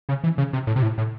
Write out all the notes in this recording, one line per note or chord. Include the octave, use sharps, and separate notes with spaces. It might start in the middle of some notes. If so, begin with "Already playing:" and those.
C#3
E3
C#3
C3
A2
C3
A2
A2